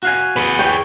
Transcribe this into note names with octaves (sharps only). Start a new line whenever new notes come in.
F#4 F5 G#5
G#4 B4
C#5 G5